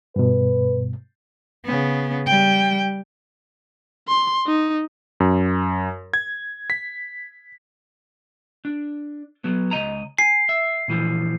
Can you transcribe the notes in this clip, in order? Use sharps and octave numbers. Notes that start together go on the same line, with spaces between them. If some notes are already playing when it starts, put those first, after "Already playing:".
G2 B2 B4
C#3 B3
G3 G5
C6
D#4
F#2
G#6
B6
D4
F#3 B3
C#2 D#5 A#5
G#5 C7
E5
A#2 E3 F3